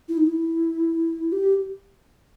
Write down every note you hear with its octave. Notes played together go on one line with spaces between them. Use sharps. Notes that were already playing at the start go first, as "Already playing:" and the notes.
E4
D#4
E4
G4